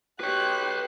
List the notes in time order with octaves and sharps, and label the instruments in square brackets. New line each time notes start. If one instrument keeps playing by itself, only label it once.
[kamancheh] G4 F#6 [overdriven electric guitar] B4 C#5